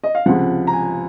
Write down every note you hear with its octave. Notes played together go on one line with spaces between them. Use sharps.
D#5
F5
C#2 C3 F3 F#5
A#5
G#5